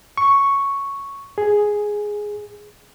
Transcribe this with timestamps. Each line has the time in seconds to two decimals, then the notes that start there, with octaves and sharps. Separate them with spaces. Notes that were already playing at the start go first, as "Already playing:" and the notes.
0.17 C#6
1.38 G#4